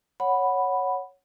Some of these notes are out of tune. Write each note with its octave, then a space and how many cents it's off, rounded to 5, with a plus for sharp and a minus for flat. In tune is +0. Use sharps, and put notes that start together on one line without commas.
C#5 +0 F#5 +0 B5 +0